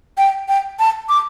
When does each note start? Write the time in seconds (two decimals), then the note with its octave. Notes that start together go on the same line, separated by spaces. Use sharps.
0.18 G5
0.48 G5
0.80 A5
1.09 D6